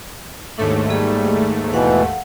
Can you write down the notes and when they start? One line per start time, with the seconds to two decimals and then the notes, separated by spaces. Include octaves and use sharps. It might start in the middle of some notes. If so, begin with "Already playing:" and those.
0.58 D#2 G#2 A3 D4 A4 C#5
0.89 G3 A#3 G#4
1.73 B2 E3 F5 F#5